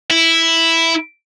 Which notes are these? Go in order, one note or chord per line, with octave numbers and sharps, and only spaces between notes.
E4